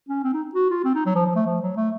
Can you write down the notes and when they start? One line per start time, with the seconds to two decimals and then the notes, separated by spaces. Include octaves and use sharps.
0.09 C#4
0.24 C4
0.33 D#4
0.55 F#4
0.70 F4
0.84 C4
0.95 D#4
1.06 F#3
1.15 F3
1.26 F3
1.35 A3
1.46 F3
1.62 F#3
1.76 A3